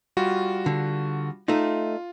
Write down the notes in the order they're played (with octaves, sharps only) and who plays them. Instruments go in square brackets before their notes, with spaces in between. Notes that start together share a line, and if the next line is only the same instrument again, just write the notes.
[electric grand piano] G3 F4 F#4
[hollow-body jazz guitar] D3
[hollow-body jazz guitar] A3 D#4 [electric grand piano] F4